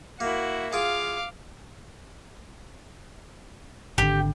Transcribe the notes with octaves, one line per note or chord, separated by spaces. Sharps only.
A#3 E4 F#4
F4 G#4 F5 D6
G#1 D3 G4